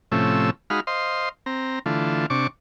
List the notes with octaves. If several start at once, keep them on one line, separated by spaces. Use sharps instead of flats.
A2 C3 F3 A3 C#4 E5
G#3 D#4 F#4 F5 B5 F6
C5 D#5 F5 C6
C4 A#5
D3 E3 A3 F4
C3 D4 C#6 D6